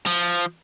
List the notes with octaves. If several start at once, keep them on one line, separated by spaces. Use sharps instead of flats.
F3